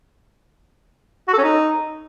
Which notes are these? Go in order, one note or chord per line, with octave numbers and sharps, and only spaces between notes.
F#4
A4
C#4
D#4